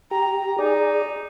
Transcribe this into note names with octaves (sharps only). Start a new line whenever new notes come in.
G4 A#5
D#4 G#4 D5